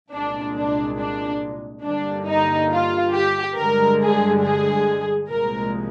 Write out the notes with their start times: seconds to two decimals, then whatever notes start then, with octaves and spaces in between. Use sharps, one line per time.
0.13 C2 A#2 G#3 D4
0.56 D4
0.99 D4
1.85 G2 D3 G3 A#3 D4
2.27 D#4
2.71 F4
3.14 G4
3.57 G2 D3 G#3 A#4
4.00 G#4
4.42 G#4
5.29 C2 A#2 F3 G#3 A#4